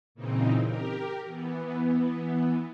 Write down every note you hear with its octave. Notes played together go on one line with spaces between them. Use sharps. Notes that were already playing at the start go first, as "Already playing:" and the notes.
A#2 C#3 E3 C4 D#4
G4 A#4
E3 B3